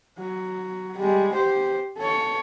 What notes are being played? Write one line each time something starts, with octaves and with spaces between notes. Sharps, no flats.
F#3
G3 G#3
G4 C5
A4 C#5